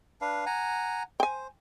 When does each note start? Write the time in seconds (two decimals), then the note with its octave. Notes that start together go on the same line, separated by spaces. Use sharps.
0.21 D4 B4 F5
0.46 F#5 G#5 A#5
1.20 C5 G5 G#5